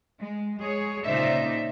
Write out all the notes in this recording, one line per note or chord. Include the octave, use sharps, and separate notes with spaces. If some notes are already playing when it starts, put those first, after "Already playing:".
G#3
G#3 G#4 C#5
A#2 C#3 D#4 C5 D5 E5